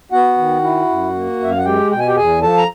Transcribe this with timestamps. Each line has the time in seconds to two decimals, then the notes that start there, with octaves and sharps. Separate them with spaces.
0.12 B3 F#4 F#5
0.38 D#3
0.64 E4
0.89 F#2
1.14 A#3
1.40 F#2 E5
1.51 F5
1.58 F#5
1.65 G#3 G4 G5
1.91 B2 G5
1.99 G#5
2.08 G4 G5
2.16 E2 G#4 G#5
2.42 F3 A4 A5
2.57 A#5